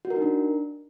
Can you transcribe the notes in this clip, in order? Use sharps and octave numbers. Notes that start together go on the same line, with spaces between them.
F#4
A#4
D#4
D4